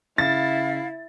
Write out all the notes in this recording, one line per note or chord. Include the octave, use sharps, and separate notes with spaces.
C#3 E4 F5 A6